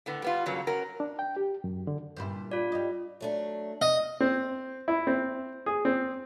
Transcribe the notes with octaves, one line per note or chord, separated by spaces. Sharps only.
A2 D3 B3
G3 B3 F4
G2 C#3 F#3 A#3
C#4 F#4 A#4
D4
G5
G4
F#2
D3
G2 A#2 E4
F4 D5
G3 D#5
F#3 A3 D4
D#5
C4
E4
C4
G#4
C4